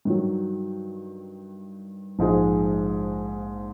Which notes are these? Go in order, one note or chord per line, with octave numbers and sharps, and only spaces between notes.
G2 D#3 F#3
A#1 G#2 F3 G#3